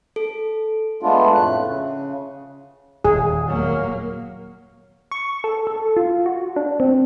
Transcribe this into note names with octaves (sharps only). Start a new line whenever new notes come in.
A4
G#3 A3 B3 D4 F4
F2 A2 A3 F#6
C#3
D#1 E2 G#4
F#3 A#3
C#6
A4
A4
F4
F#4
D4
C4